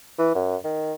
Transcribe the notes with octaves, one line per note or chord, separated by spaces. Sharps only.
E3
F#2
D#3